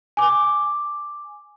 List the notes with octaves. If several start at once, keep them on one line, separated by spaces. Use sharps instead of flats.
G#5 D6